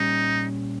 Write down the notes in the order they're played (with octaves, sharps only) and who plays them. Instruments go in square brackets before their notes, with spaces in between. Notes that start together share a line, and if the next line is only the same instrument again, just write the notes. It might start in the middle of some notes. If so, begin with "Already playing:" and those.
Already playing: [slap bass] A#2 G3 C#4 [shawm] D#4